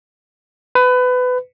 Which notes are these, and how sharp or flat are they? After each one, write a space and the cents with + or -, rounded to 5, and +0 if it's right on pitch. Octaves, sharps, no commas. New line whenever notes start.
B4 +25